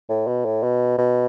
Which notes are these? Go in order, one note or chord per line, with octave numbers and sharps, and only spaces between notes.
A2
B2
A2
B2
B2